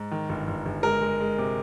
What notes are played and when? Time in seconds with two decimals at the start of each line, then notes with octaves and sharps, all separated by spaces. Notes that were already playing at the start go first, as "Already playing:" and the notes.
Already playing: G#2
0.11 D#3
0.29 G1
0.47 G1
0.66 G1
0.83 G#3 A#4
1.01 G#3
1.20 G#3
1.38 C3